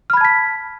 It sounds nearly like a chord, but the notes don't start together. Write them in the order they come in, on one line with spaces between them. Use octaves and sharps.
F6 B5 G#6 A5 B6